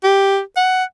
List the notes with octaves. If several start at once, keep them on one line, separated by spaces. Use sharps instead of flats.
G4
F#5